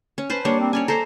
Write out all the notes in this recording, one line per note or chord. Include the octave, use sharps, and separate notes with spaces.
C#4
B4 C5 A5
G3 A#3 D4 C#5
C4
C#4 C#5 D5 G#5
A4 C5 A#5